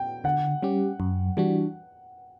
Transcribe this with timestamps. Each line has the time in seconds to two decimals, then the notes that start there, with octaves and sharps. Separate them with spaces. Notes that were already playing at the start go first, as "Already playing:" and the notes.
Already playing: G5
0.24 D3 F#5
0.62 G3 C#4 G4
1.00 F#2
1.37 E3 G3 D4 F#4